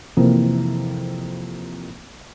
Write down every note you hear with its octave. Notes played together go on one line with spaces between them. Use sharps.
F2 C3 E3 A#3